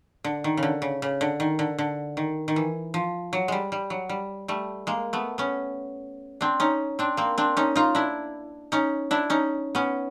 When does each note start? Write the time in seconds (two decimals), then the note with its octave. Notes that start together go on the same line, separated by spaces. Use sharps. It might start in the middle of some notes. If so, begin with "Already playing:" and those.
0.24 D3
0.44 D#3
0.57 C#3
0.63 D3
0.82 C#3
1.02 C#3
1.21 D3
1.40 D#3
1.59 D3
1.78 D3
2.17 D#3
2.48 D#3
2.56 E3
2.94 F3
3.33 F#3
3.48 G3 G#3
3.72 G3
3.90 F#3
4.09 G3
4.48 G3 A3
4.87 G#3 A#3
5.13 A3 B3
5.38 B3 C#4
6.41 C4 D4
6.60 C#4 D#4
6.99 C4 D4
7.17 A#3 C4
7.38 C4 D4
7.57 C#4 D#4
7.76 D#4 F4
7.95 D4 E4
8.72 C#4 D#4
9.11 D4 E4
9.30 C#4 D#4
9.75 B3 C#4